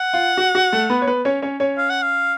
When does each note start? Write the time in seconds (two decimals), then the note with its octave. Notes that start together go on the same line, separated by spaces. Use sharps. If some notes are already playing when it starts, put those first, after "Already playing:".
Already playing: F#5
0.13 F4
0.37 F#4
0.55 F#4
0.72 A3 A4
0.90 B3 B4
1.02 C#5
1.07 B3 B4
1.25 C#4 C#5
1.42 C#4 C#5
1.60 C#4 C#5
1.78 F5
1.90 F#5
2.02 F5